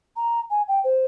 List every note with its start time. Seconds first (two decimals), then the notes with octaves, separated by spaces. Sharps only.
0.16 A#5
0.51 G#5
0.68 G5
0.84 C5